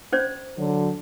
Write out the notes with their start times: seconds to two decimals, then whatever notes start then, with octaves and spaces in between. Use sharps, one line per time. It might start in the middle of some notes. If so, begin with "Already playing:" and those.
0.12 C#4 C5 D5
0.58 D3 F#3